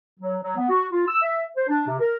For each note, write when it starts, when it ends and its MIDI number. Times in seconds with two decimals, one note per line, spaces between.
0.20 0.36 54
0.42 0.54 54
0.56 0.67 59
0.69 0.86 66
0.92 1.06 65
1.07 1.17 88
1.22 1.42 76
1.56 1.64 72
1.68 1.83 62
1.87 1.99 48
2.00 2.17 70